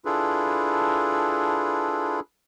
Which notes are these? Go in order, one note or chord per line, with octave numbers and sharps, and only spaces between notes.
D4 E4 F4 G#4 A4 B4